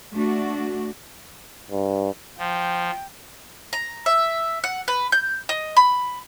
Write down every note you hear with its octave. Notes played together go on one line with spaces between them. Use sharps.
A3 D4 F#4
G2
F3 G5
A#5
E5
F#5
B4
G6
D#5
B5